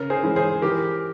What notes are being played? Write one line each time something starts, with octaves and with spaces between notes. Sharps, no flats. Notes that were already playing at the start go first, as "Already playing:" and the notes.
Already playing: C#3 A#4 C#5
G#4 C5
E3 G#3 C#4
G#4 C5
E3 G4 A#4